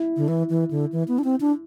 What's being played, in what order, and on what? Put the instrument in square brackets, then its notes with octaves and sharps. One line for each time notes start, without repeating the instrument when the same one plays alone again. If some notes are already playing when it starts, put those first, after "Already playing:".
Already playing: [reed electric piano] E4
[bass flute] D3
E3
E3
D3
E3
B3
D4
C4
D4